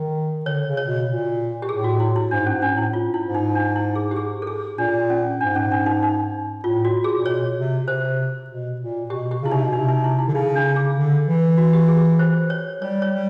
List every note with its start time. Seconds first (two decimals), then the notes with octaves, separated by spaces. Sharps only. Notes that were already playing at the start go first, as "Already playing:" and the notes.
Already playing: D#3
0.45 D3 C#5
0.67 C#3
0.77 C#5
0.87 B2
1.08 A#2
1.62 G4
1.69 A2 G#4
1.84 F#4
2.00 E4
2.16 E4
2.31 G#2 D4
2.46 C#4
2.52 G#2
2.62 D4
2.72 A2
2.77 E4
2.93 F4
3.14 E4
3.24 G#2
3.35 D#4
3.55 D4
3.76 E4
3.95 G#4
4.11 G4
4.16 G#4
4.42 A4
4.47 G#4
4.78 A#2 D4
5.10 C#4
5.40 G#2 D4
5.55 C#4
5.72 D4
5.86 D#4
6.02 D#4
6.64 A2 F4
6.85 F#4
7.04 G#4
7.18 A#2
7.26 B2 C#5
7.57 C3
7.87 C3 C5
8.50 B2
8.80 A#2
9.10 B2 G4
9.31 G4
9.42 C#3 E4
9.51 C3 D#4
9.64 B2
9.73 C3 D#4
9.88 D#4
10.04 E4
10.19 E4
10.28 D3
10.34 C#3 D#4
10.56 D4
10.76 G#4
10.96 D3
11.27 E3
11.58 F#4
11.73 G4
11.88 G#4
12.19 C5
12.50 C#5
12.82 G3 C#5
13.02 C#5
13.12 G3